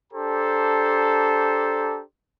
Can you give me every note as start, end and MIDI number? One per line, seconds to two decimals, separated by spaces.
0.12 2.01 62
0.12 2.01 67
0.12 2.01 69
0.12 2.01 72
0.12 2.01 82